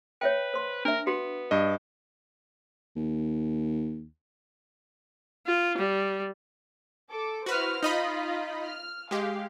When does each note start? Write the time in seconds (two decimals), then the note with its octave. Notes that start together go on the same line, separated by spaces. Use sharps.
0.21 B4 C#5 E5 G5
0.54 C5 C6
0.85 D4 A#4 E5
1.07 B3 F#4
1.51 G2 D#5
2.96 D#2
5.47 F4
5.78 G3
7.09 A4 D6
7.46 E4 F#4 B4 C5 F6
7.83 D#4 F4 D#5 B5
8.64 F6
9.11 G#3 G4 F5